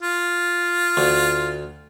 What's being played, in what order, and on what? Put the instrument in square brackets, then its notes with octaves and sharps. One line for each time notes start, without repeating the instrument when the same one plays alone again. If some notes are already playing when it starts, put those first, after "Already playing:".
[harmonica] F4
[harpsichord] D2